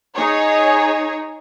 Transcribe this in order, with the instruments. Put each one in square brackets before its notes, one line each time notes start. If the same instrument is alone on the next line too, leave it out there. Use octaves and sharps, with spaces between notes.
[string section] D#4 G#4 C#5